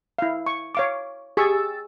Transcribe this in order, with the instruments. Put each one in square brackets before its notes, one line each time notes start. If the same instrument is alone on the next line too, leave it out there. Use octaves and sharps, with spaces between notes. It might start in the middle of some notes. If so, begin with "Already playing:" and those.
[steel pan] E4 F5
C#6
C#5 F5 D6
[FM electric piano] G4 E6 A6 [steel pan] G#4 C#6